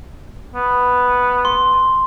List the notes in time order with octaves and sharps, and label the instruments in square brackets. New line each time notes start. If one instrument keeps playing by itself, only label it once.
[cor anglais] B3
[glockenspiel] C6